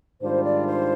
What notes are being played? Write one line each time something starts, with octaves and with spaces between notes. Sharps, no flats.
G#2 D#3 G3 D4 F4 C5
D5
C5